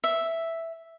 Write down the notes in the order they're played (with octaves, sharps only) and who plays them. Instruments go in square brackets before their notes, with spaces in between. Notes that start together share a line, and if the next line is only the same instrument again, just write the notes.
[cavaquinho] E5